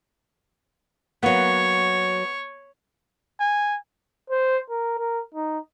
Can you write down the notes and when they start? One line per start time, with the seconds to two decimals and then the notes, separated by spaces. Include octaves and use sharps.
1.23 F#3 A#3 B3 C#5
3.40 G#5
4.30 C5
4.70 A#4
4.99 A#4
5.35 D#4